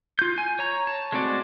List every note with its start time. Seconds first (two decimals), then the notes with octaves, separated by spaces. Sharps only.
0.19 F4 G6
0.38 G#5
0.59 C#5 A#5
0.87 A5
1.12 G#3 A3 C4 F#4 D5